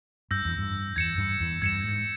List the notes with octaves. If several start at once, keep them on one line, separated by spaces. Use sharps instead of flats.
G2 E6 G6 A#6
E2
G2
E2 G#6 C#7 E7
G2
E2
G2 G#6 C#7 E7
G#2